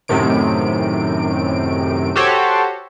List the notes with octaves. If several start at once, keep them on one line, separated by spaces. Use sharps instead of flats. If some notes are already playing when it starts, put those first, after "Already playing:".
F#2 A2 C3 D#3 D7
F#4 G4 A4 C5 C#5